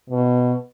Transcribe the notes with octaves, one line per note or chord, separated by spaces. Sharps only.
B2